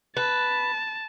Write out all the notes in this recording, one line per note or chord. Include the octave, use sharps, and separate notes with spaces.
B4 A5